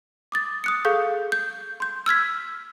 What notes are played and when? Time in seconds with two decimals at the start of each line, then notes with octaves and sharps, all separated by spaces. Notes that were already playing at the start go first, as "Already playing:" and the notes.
0.32 D6 D#6 A6
0.64 D#6 F#6 C#7
0.85 G#4 A4 F5 C#6 G6
1.32 G6
1.80 C6 G6
2.06 E6 F6 G#6 B6